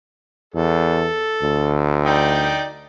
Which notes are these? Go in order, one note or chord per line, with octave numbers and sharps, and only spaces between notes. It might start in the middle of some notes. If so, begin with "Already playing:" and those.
E2 A4
D2
D#4 D5 G5